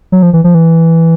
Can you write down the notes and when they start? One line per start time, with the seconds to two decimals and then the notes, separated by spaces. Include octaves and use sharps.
0.12 F#3
0.23 F3
0.33 E3
0.44 F3
0.55 E3